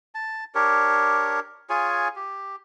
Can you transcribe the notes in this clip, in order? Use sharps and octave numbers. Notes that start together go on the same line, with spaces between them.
A5
D4 G4 A#4 C#5
F4 G#4 C#5 G#5
G4